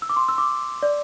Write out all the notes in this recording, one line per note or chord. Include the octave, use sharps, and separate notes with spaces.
E6
D6
C6
E6
D6
D5